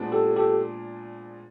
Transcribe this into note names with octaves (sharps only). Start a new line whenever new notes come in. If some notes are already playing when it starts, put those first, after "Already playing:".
Already playing: A#2 F3 G#3 B3 D4
G4 A4
G4 A4